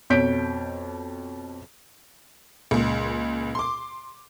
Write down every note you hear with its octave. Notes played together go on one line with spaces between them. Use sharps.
F2 B2 C#5 G6 B6 D7
C#2 A#2
C6 D6